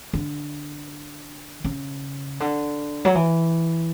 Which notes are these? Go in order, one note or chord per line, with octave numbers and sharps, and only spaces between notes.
D3
C#3
D3
F#3
E3